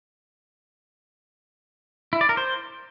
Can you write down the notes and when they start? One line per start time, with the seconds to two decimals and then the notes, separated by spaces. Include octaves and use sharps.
2.13 E4
2.21 D5
2.29 A#4
2.37 C5